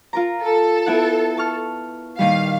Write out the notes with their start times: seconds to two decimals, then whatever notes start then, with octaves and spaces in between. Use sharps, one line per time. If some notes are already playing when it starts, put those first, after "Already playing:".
0.13 F4 A#4 A#5
0.43 A4
0.86 B3 E4 F#5
1.37 A5 C#6 F6
2.19 A#2 D#3 G3 F5